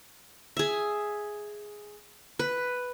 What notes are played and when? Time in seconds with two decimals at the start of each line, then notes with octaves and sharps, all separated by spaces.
0.57 G#4 E5
2.39 B4